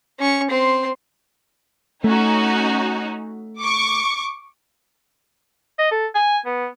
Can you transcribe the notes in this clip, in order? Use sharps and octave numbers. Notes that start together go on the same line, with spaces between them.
C#4 C#6
C4 C6
A3 C#4 D#4 F#4
C#6 D6
D#5
A4
G#5
B3